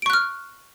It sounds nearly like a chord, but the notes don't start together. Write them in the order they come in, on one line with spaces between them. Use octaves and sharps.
D7 C#6 F#6 F6